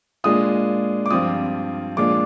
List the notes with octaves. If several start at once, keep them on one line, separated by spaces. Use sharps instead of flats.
A#2 G#3 D4 F4 D#6
D6
G2 F3 C4 F4 D#6
A#2 F3 G#3 D4 F4 D6